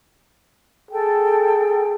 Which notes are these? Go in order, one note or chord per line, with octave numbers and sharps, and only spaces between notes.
G#4 A4 G5